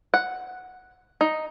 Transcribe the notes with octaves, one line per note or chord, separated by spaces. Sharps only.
F#5
D#4